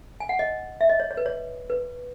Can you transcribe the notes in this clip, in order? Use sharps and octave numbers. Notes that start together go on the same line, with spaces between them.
G#5
F#5
D#5
E5
D#5
C#5
C#5
B4
C#5
B4